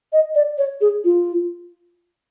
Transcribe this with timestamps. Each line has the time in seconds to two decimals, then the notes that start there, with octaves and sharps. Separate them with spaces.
0.13 D#5
0.35 D5
0.58 C#5
0.81 G#4
1.04 F4